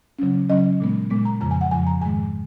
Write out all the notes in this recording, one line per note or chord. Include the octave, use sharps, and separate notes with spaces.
C#3 F#3 C#4
C#3 F#3 C#4 D#5
A#2 G#3 B3
A#2 G#3 B3
A#5
F2 C#3 F3 A#5
G#5
F#5
F2 C#3 F3 G#5
A#5
G#2 D#3 G#3 G#5